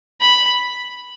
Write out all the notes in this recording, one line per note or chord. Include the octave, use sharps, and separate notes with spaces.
B5